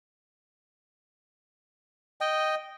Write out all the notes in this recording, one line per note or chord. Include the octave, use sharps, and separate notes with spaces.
D#5 G5